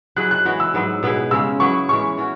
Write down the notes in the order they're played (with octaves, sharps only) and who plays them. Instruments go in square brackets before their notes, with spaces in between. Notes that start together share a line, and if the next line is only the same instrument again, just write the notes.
[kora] F#3 E4 G#4 [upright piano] F#6
[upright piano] F#6
[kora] E3 G#3 B3 F#4
[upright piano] E6
[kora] G#2 F#3 B3
B2 B3 E4 G#4
[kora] C#3 G#3 C#4 [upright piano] E6
[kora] F#3 B3 E4 [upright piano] C#6
[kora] E3 G#3 C#4 [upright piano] C#6
[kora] E3 C#4 F#4